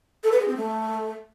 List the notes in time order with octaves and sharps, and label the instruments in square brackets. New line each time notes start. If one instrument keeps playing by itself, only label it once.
[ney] A4
B4
G#4
C4
A3